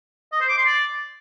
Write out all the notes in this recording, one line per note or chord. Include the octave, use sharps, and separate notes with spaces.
D#5
C5
D6
C6
D5